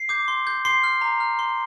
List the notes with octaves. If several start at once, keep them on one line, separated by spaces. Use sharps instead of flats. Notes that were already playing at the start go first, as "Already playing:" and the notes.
Already playing: C7
D6 G6
C6
G6
C6 C7
F6
A#5
F6
C6